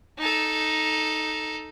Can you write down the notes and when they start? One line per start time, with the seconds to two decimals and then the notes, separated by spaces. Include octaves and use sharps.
0.18 D#4 A4